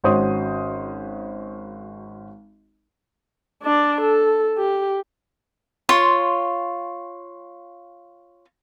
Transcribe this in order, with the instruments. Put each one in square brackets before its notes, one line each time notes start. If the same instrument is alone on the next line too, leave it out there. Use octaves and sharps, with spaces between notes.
[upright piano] G#1 C#4 F#4 C5 C6 D#6
[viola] D4 D5
A4
G4
[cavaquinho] F4 C#5 C6